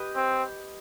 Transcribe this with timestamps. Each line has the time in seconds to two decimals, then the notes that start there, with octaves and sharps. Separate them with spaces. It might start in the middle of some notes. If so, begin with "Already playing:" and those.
Already playing: G4 B4 D#5
0.15 C4